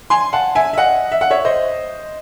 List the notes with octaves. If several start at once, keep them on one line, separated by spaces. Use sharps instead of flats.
G#5 C6
F#5 A5
E5 G#5
E5
D#5 F#5
E5
F#5
C#5 E5
C5 D#5